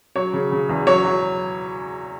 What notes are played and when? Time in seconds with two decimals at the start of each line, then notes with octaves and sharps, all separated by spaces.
0.16 F#3 C#5
0.33 C#3
0.52 C#3
0.69 E2
0.87 F#3 C#5
1.05 F#3